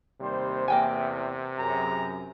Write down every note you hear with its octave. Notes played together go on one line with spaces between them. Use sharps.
D#2 C3 G3 C5
E2 A#3 G5 G#5
F#2 G#4 A#5